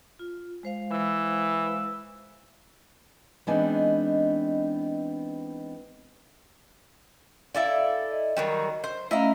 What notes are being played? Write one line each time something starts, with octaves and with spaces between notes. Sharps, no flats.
F4
G#3 C5 F5
E3 E6
E3 G#3 B3 C4 D4 D#4
E4 A4 D5 F5
D#5
D#3 F#3 G3
C5
A3 C#4 E4 D#5 F5 A#5